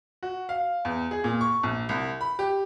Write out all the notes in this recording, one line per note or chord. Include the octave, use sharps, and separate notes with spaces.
F#4
F5
E2
G#4
A#2
C#6
A#1
C2
B5
G4